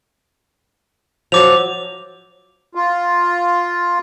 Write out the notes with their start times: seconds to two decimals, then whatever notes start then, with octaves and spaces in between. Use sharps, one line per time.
1.32 F3 F#3 D6 F7
2.75 F4